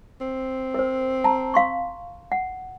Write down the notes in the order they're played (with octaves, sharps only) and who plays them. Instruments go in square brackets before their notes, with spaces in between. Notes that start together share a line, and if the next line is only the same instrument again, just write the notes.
[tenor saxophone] C4
[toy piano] A#4 C5
A5 A#5
F5 C6 C#6
F#5